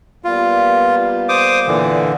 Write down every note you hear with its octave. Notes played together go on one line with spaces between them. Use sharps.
G3 A#3 B3 F4
C5 D6 D#6
A#2 D3 E3